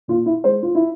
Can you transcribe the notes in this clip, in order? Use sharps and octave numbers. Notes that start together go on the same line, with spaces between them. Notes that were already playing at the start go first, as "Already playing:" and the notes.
A#2 F4
E4
G#3 C5
F4
E4